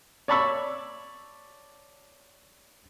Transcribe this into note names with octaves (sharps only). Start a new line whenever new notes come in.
C#5 D5 A5 B5 C#6 E6